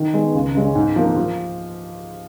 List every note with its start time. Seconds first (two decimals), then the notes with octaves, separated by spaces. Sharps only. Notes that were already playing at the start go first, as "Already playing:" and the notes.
Already playing: D#3
0.14 G#3 B3
0.34 C#2
0.55 C#3 G#3 C#4
0.75 G#2
0.96 F3 A#3
1.16 F3